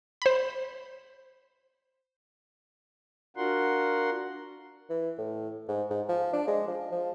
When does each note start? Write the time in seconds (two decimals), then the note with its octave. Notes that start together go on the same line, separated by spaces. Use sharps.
0.22 C5 B5
3.37 D4 F4 F#4 A#4 F#5 C6
4.90 E3
5.18 A2
5.69 G#2
5.90 G#2
6.09 F3
6.33 D4
6.48 G#3
6.68 F3
6.92 F3